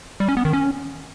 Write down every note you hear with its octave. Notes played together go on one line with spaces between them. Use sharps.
G3
C#4
B3
D#3
C#4